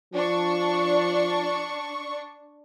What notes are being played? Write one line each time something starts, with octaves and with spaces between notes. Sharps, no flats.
F3 D4 C#6